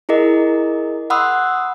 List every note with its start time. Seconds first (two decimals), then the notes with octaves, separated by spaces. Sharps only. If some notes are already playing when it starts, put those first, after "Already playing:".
0.09 E4 G#4 A#4 D#5
1.10 F#5 B5 C6 D#6 E6 F#6